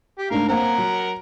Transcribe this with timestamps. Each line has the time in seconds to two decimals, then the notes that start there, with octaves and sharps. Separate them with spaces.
0.19 G4
0.31 G#2 A3 D4 A#4 F5
0.49 A#3 C4 A#4 F#5 A#5
0.78 F#3